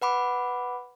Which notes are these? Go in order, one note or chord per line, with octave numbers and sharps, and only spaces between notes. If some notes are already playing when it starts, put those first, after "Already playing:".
B4 F#5 B5 D6